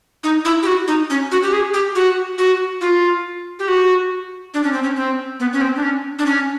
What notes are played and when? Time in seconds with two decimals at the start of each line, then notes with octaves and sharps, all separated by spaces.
0.24 D#4
0.45 E4
0.63 G4
0.67 F#4
0.88 D#4
1.10 C#4
1.32 F#4
1.43 G4
1.53 G#4
1.74 G4
1.95 F#4
2.38 F#4
2.81 F4
3.59 G4
3.68 F#4
4.54 D4
4.64 C#4
4.73 C4
4.83 C#4
4.96 C4
5.40 B3
5.53 C#4
5.61 C4
5.76 D4
5.83 C#4
6.19 D4
6.26 C#4